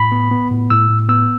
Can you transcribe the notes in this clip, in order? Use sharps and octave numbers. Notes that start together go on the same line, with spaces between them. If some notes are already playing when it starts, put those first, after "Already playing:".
Already playing: A2 B5
B3
B3
A2
A2 E6
A2
B3 E6